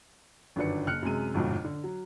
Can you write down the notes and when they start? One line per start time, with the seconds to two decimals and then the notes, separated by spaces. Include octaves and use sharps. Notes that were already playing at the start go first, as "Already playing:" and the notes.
0.56 G1 F#2 D#3 D4 B4 C#7
0.87 F#1 F6 F#6 C#7
1.02 F#2 C3 G#3 D#7
1.34 G1 F2 G#2 B2
1.65 D3
1.84 F#3